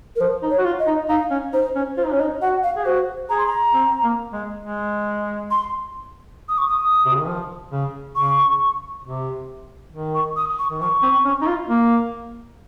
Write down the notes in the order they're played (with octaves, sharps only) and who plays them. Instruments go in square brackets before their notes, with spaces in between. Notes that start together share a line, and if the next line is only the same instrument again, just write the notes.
[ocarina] A#4
[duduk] F3 [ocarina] C5
[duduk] D#4
[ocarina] C#5
[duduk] F#4
F4
[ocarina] D#5
[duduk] D#4
[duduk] D#4 [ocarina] F5
[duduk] C#4
[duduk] D#4 [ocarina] C5
[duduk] C#4
[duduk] F4 [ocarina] C5
[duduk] D#4
[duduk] C#4 [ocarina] C#5
[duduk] D#4 [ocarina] D#5
[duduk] F#4 [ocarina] F#5
[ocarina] F5
[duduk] G#4
[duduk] F#4 [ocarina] C5
[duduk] G#4 [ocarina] A#5
[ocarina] C6
A#5
[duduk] C4
A#3
G#3
G#3
[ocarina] C6
D#6
C#6
D#6
[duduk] C3
C#3
D#3
F3
C#3
[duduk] C#3 [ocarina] C#6
[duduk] C3
D#3
[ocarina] C#6
D#6
C#6
[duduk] D#3
[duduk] F3 [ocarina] C#6
[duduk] C4
C#4
D#4
F4
A#3